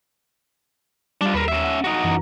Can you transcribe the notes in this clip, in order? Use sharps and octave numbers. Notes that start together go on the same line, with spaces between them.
G3 D4 F4
D#2 A#4 B4 C7 E7
C#4 E5
F#5
D#4 F#4
F#2 E3 A#5